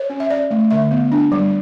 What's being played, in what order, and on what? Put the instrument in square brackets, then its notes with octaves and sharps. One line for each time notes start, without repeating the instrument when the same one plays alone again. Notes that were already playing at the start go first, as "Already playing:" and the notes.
Already playing: [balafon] C#5
C#4
E5
C#4 D5
A3
D3 E5
B3
D4
G3